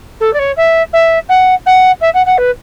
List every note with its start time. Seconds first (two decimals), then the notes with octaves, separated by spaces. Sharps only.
0.20 A4
0.33 D5
0.39 C#5
0.57 E5
0.93 E5
1.29 F#5
1.66 F#5
2.01 E5
2.14 F#5
2.26 F#5
2.37 B4